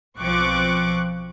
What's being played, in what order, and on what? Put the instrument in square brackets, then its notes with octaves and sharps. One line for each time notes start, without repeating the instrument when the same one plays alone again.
[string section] B1 F3 C4 C#6 D6 F#6